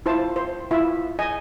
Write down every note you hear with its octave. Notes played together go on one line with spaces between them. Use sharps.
E4 F4 C5 A5
C5
E4 F4 E5
D#5 G#5